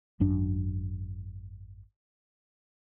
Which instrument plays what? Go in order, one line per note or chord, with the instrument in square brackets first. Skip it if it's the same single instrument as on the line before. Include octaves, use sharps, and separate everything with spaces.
[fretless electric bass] G#1 F#2 D4